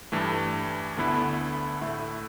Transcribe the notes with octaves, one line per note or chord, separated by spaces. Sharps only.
G2 E3 A3
D2 D3 B3 E4 B4
A2 A3 E4